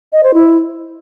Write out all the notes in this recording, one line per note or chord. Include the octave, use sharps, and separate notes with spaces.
D#5
C5
E4